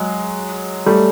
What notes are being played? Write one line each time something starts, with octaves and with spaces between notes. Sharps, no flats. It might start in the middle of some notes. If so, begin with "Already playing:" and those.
Already playing: F#3 G#3
G3 A3